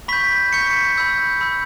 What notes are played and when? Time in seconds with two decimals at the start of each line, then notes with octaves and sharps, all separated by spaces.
0.08 B5 C#6 G6 B6
0.53 C#6 G6 C#7
0.61 B6
0.70 C#6 C#7
0.97 B5 E6 G6
1.41 B5 E6 G6